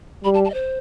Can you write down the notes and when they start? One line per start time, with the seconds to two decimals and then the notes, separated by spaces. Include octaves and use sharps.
0.24 G3 B5
0.34 A5
0.45 A5
0.50 D#5
0.54 C5